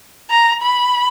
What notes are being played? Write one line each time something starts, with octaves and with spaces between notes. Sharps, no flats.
A#5
B5